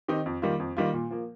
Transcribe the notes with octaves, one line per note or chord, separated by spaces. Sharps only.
D#3 C4 D#4 G4
F2
D#3 G3 A#3 F4
F2
D#3 G3 A#3 F4
A#2
F3 A#3